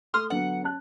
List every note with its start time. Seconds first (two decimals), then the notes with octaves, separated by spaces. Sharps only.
0.14 A3 C6 D#6 F6
0.30 D3 F#3 B3 F#5
0.63 C#4 A5 F#6